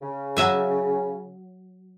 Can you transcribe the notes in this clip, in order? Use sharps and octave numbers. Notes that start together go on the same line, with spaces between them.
C#3
F#3 E5 G#5